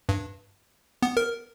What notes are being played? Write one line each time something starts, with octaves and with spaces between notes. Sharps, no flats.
G2
B3
A#4